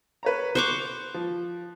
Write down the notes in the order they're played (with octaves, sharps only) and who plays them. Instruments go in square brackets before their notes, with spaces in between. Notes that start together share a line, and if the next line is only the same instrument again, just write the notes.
[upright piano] B4 C#5 A#5
[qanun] C5 C#6 D6 [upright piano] F#6 C#7 F7
[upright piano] F3